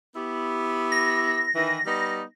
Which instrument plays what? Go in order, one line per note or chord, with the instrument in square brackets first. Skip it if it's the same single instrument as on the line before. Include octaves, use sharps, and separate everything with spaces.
[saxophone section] B3 E4 G4
[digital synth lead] A#6
[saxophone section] D#3 E3
G3 B3 D#4